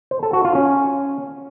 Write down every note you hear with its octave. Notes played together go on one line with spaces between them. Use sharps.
C5
A4
F#4
F4
C#4